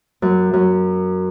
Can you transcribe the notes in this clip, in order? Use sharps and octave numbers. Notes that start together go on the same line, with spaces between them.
F#2
F#2